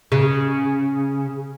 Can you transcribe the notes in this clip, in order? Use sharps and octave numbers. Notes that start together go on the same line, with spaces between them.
C#3